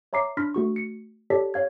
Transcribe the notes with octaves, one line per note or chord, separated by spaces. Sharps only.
C#5 E5 A#5 D6 C7
D4 B5 C6 F6 A#6 B6
A3 F#4 C#6
C#7
G4 A4 C#5 D5 A5 B6
C#5 F5 G#6